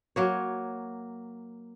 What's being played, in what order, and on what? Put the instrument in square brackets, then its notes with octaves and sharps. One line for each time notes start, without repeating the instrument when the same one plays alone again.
[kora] F#3 A#3 C#5